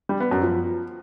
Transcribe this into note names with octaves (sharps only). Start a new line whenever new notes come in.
G3
B3
F#2
F3